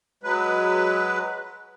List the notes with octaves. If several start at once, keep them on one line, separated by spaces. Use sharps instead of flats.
F#3 G#3 B4